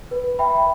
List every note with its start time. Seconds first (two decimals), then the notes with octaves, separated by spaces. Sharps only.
0.11 B4
0.39 E5 G5 B5